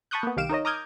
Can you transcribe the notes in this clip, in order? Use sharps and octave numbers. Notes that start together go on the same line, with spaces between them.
A5 B5 C#6 D#6 F#6 G6
A#3 B3
C2 D#3 G4 F5 D7 E7
D#4 A#4 C#5 D#5
A#5 D6 D#6 F6 G6 G#6